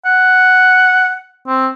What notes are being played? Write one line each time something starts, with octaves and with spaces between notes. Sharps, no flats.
F#5
C4